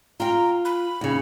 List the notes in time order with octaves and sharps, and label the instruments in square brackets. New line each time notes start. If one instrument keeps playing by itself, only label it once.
[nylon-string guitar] F4 G5 [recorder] A#5
[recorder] B5
[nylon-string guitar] D#2 C#3